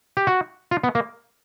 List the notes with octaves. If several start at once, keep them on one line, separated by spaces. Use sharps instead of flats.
G4
F#4
F4
B3
A#3